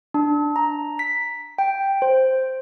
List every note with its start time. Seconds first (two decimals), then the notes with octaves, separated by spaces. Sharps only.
0.14 D4
0.56 A#5
0.99 B6
1.58 G5
2.02 C5